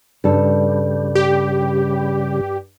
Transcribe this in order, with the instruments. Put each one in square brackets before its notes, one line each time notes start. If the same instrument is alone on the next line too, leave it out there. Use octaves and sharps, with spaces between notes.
[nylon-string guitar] G2 A4 [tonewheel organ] C#3 G3
[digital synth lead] G4